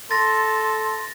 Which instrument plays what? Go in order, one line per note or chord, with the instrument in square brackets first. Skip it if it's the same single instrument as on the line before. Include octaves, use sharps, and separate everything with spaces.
[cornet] A4 [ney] C6 [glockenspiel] A6 A#6